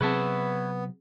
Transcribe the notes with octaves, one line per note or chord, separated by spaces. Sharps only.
C3 F#3 B3 C4 G#4 B4 C#5 E5